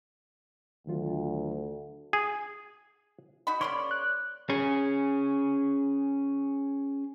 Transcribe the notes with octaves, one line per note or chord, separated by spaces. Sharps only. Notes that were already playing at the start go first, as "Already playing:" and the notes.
D2 D#3 F#3 F4
G#4
D#4 F#4 B5
C#3 A#3 C#5 D5 B5 C6
F#6
C#4 G#4